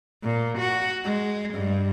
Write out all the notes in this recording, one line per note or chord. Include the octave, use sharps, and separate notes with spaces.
A#2
F#4
G#3
G2